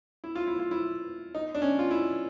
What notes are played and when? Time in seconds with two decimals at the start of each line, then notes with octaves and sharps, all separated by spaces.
0.24 E4
0.35 F4
0.47 E4
0.59 F4
0.71 E4
1.35 D#4
1.55 D4
1.62 C#4
1.79 F4
1.91 E4